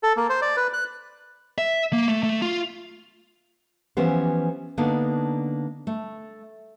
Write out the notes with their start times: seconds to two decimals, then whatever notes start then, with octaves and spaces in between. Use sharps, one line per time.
0.03 A4
0.17 A#3
0.29 C5
0.42 D5
0.57 B4
0.73 F#6
1.58 E5
1.93 A#3
2.09 A3
2.23 A3
2.42 F4
3.97 E3 F3 B3 C#4 G4 C5
4.77 D3 A#3 B3 D4 D#4
5.87 A3